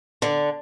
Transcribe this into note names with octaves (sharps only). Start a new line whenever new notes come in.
D3